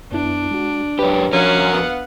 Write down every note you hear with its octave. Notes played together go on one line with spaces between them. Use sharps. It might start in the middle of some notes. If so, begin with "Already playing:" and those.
F#2 B3 D4 E4
G#3 F#4
F#2 G4 B4 C#5
F2 F3 C#4 F#4 A#4 F5 F#5
B3